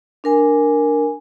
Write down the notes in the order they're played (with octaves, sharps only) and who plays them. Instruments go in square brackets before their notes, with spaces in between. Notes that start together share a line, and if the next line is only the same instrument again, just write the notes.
[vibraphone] D4 A#4 G#5